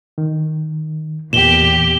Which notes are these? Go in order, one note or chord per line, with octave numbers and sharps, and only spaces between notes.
D#3
E2 A#2 G4 E7 G7